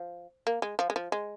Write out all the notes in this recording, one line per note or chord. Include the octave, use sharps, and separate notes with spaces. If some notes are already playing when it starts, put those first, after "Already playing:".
Already playing: F3
A#3
G#3
F3
G#3
F3
G#3